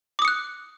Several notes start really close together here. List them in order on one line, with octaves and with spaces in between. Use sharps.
D6 D#6 C#7 F#6